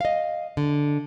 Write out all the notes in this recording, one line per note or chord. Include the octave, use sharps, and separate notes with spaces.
D#5 F5
D3